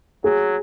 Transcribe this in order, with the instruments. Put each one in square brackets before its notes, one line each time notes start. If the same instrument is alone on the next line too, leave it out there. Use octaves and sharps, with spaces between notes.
[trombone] F#3 [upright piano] G#4